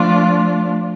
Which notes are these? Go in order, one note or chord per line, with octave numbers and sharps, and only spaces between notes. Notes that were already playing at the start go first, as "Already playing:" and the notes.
Already playing: F3 A3 D4 F4